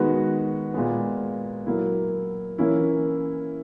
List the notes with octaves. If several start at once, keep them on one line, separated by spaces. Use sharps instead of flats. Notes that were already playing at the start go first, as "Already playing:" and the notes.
Already playing: D#3 G#3 B3 F#4 B4
A#2 G#3 B3
F#3 A#3 E4
E3 A#3 C#4 E4